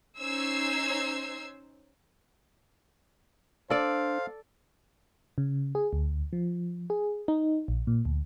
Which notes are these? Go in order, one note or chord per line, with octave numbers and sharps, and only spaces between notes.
C#4 D#4 C5 E6 G#6 C7
D4 A4 C5 D5 F5
C#3
G#4
D2
F3
G#4
D#4
A#1
A#2
D2